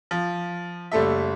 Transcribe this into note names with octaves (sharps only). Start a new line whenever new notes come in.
F3
F#1 G3 A3 A4 E5